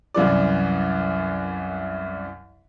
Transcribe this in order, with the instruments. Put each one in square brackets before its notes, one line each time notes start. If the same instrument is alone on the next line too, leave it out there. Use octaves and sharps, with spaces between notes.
[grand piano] C2 F#2 E3 D5